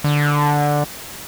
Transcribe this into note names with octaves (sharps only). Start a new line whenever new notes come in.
D3